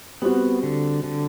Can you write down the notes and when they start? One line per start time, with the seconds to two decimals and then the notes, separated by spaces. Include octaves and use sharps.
0.22 G3 B3 C4 F#4
0.63 D3
1.04 D3